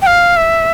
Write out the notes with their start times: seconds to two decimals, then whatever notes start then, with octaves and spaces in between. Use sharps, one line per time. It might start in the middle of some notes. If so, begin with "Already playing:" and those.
0.02 G5
0.07 F5
0.37 E5